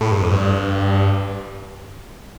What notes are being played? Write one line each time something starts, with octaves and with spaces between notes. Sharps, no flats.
A2
G2
F2
G2